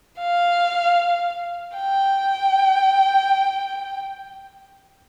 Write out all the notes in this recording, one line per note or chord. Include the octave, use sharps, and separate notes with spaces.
F5
G5